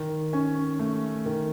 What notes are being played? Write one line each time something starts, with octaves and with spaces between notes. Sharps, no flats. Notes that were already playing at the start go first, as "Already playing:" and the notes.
Already playing: D#3
C#4
A3
D#3